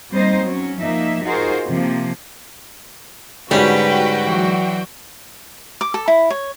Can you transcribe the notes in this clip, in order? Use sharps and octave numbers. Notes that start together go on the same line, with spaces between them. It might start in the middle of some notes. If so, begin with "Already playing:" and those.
G3 A#3 C4 D#4 C5 D#5
F#3 C#4
F3 A#3 D#4 E5
D#4 F4 F#4 G#4 A#4 C5
C3 F3 A#3
G#2 D3 G3 C#4 F#4 B4 G5
E3 F#3
D6
A4
E4
C#5